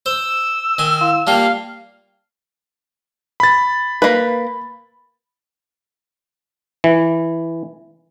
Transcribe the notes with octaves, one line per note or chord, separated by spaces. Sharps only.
C5 E6
D#3 G#5
E4 F5 C6
G3 A#3 F4 F5 G5 A5
B5 A6
A#3 B4
E3